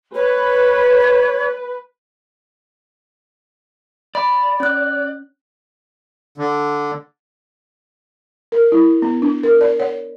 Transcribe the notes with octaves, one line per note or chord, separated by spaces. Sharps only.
B4 C#5
D5 B5
C#4 F#6
D3
A#4
E4
B3
D4
A#4
D5
C#5